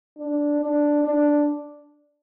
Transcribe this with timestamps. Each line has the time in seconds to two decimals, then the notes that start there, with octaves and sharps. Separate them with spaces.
0.18 D4
0.61 D4
1.04 D4